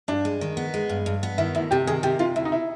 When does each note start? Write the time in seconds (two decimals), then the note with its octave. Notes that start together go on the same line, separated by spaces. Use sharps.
0.08 G2 D4
0.25 G#3
0.41 D#3
0.57 B3
0.74 G#3
0.89 G2
1.06 G2
1.23 B3
1.38 D#3 E4
1.55 D2 E4
1.71 C3 G4
1.87 D#3 G#4
2.03 C3 G4
2.19 C3 F4
2.36 D2 E4
2.45 D#4
2.52 E4